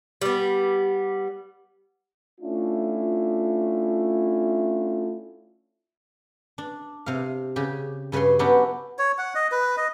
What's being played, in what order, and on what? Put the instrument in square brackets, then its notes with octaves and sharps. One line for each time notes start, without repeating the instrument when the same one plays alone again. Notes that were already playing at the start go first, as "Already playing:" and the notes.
[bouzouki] G3 B3
[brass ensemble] A3 C#4 D4 E4 F4
[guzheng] D4
C3 F5
C#3 G4
G2 C#3 B4 C#5 C6
F#3 B3 C#4 D4 E4 G4
[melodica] C#5
F#5
D#5
B4
D#5